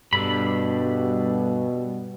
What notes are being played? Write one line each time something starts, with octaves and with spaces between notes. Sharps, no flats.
G2 B2 G3 D4 A4 B5